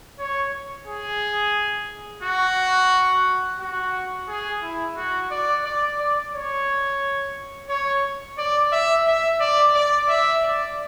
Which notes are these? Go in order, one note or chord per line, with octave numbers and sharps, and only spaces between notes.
C#5
G#4
F#4
F#4
G#4
E4
F#4
D5
D5
D5
C#5
C#5
D5
E5
E5
D5
D5
E5
D5